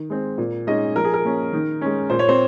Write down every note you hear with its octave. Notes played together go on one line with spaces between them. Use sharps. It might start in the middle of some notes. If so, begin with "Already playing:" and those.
Already playing: D#3
G#3 C4
A#2
G#3 C#4 D#4 D#5
F3 A#4
G#4
A#4
A#3 C#4
D#3
G#3 C#4
A#2 C5
C#5
C4 C5